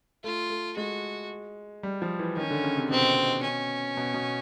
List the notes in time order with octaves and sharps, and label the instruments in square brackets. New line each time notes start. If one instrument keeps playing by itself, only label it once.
[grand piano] A3 [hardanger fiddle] F4
[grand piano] A3
[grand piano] G#3 [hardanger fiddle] F#4
[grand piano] G3
F3
E3
[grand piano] D#3 [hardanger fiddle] C#4
[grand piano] D3
C#3
C3
[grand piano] B2 [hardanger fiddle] C4
[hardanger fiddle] C#4
[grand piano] B2
B2